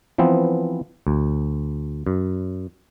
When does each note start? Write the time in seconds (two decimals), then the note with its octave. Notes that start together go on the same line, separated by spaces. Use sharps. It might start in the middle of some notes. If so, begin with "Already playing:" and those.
0.18 E3 F3 B3 C4
1.07 D2
2.07 F#2